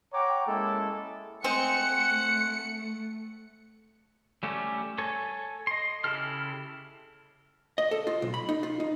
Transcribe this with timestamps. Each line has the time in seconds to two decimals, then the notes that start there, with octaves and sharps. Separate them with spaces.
0.13 C#5 F#5 G5 A#5 D6
0.47 G#3 A#3 C#4 E4 A4
1.44 G#3 A3 C4 F#5 C#7
4.43 G3 A3 C#4 G4
4.98 A4 C#5 G#5
5.67 D#5 C6
6.04 C#3 E4 G4 A4 F6
7.78 D#5
7.91 A4
8.07 F4
8.22 B1
8.34 B5
8.49 D#4
8.63 F4
8.80 D#4